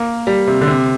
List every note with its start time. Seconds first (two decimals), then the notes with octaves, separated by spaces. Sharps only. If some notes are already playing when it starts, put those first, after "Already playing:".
Already playing: A#3
0.27 G3
0.47 C3
0.61 D3
0.68 C3